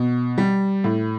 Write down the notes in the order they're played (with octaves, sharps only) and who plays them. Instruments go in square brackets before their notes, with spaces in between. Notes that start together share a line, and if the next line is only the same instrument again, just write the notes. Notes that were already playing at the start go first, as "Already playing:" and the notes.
Already playing: [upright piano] B2
G3
A2